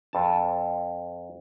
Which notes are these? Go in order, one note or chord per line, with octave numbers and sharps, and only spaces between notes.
F2 A5